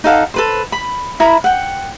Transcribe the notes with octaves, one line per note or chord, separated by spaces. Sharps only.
D#4 A4 F5 F#5
A4 B4 C5
B5
E4 A#4 A#5 B5
F#5 G5